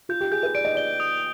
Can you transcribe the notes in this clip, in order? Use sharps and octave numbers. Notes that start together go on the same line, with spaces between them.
F4 G6
G4
G#4 G6
B4
D5 D7
D#5
D5 G7
D#6